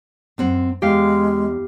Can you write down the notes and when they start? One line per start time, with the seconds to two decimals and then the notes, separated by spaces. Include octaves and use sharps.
0.38 F#2 C4 F#5
0.82 E2 G#3 G4 F5